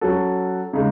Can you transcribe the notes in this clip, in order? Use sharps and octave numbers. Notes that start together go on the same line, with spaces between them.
F#3 C#4 F#4 A4
C#3 G#3 D#4